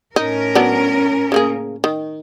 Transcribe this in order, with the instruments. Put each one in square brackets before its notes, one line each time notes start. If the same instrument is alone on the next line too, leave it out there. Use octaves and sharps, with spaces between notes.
[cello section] A2 C#4 A#4 [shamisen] D#4
[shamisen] F#3 B3 D4
C#3 A#3 G#4
D#3